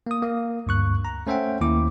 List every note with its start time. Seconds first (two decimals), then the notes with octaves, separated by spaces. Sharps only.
0.07 A#3 D#6
0.23 A#3
0.67 D2 G2 C#6 F#6
1.05 A#5
1.27 A3 C#4 C5 E5 F#5 G5
1.61 D#2 A#3 E4 D6